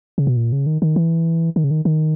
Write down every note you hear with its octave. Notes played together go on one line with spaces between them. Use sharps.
C#3
B2
A#2
C#3
D#3
D#3
E3
D#3
C#3
D#3
D#3